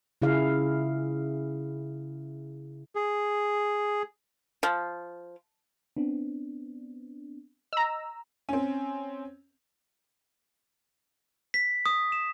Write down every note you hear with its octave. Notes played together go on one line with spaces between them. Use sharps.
C#3 E4 G#4 F5
G#4
F3
B3 C4 D4
D#5 A#5 E6
C4 C#4
B6
D#6
E7